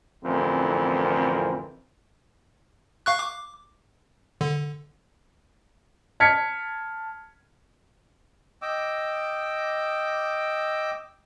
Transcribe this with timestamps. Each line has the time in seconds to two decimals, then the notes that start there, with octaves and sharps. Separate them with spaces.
0.24 A1 F2 D3 E3 C4 A#4
3.06 F5 C#6 F#6
3.19 D6
4.41 D3
6.20 A5 F6 G#6 B6 C#7
8.62 D#5 G5 D6 E6